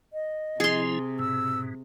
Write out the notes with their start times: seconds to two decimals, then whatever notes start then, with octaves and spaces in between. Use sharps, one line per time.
0.13 D#5
0.60 C3 F3 E4 G#4 C6
1.19 G#2 B2 E6